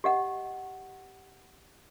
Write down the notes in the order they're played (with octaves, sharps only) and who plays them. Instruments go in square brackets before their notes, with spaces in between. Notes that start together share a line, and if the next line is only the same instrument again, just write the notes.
[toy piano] G4 D#5 F#5